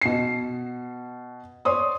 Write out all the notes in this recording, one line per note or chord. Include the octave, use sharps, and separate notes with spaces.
B2 C7
C#5 D5 C6 D#6